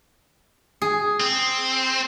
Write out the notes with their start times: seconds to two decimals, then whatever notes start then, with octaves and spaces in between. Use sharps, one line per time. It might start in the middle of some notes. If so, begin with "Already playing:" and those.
0.82 G#4
1.20 C4